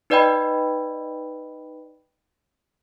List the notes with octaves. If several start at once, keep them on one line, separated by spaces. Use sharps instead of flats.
D#4 B4 D5 D#5 G5 B5